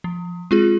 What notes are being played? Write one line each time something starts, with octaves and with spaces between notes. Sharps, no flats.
F3
G#3 C4 F4 G#4